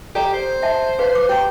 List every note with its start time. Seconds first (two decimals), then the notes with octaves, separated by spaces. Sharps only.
0.15 G4 A4 D5 A#5
0.34 C5
0.62 E5 F#5 A5
0.99 G#4 B4 F5
1.15 D6
1.29 G4 G5 A#5